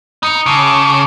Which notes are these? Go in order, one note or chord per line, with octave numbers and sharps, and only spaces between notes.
D#4 B5 C#7 F7
C#3 A5 D6 D7